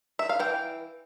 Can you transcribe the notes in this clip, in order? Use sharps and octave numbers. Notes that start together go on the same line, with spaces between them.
E5
F5
E3 G5